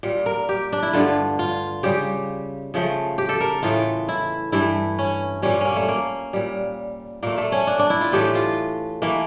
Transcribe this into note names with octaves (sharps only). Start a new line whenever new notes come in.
A#2 G3
A#4
G4
D4
E4
G2 D3 A3 F4
F4
C#3 G3 G4
C#3 F3 A3
G4
A4
A#4
A2 E3 A3 F4
E4
G2 E3 A3 E4
C#4
A#2 G3 C#4
A#3 C#4
A3
A#3
A#2 G3
A#2 A3 A#3
A3
C#4
D4
D4
E4
F4
A2 E3 A3 G4
F4
E3 A3 A#3